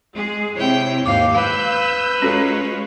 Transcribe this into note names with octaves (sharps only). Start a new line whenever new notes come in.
G#3 G#4
C3 E4 C#5 G5
D#2 G#2 F5 D6
B4 F5 E6 G6
G#3 C#4 F4 F#4 A4 C#5